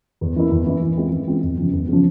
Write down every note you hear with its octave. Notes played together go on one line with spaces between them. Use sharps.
E2
E3 A#3 E4
E2
E3 A#3 E4
E3
G#3 C4 F4
E3
G#3 C4 F4
E2
C#3 F3
E2
C#3 F3